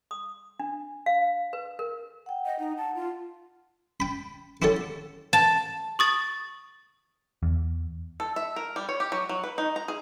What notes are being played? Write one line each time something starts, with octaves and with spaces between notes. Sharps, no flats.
D#6
D4
F5
B4
A#4
F#5 G5
D#5
D#4 F#5
A5
F4
G5 B5
E4 F#4 G4 A4 C#5
A5
C#6 D#6 A6
E2
A4
E5
A#4
G3
C#5
G4
F#3
F#3
B4
D#4
A#5
G#4